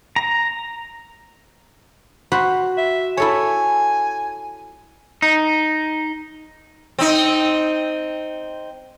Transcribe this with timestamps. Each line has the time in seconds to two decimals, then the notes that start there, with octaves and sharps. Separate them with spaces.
0.16 A#5
2.32 F#4 C5 B5
2.78 E5
3.17 E4 A4 C#5 G#5
5.22 D#4
6.99 C4 D#4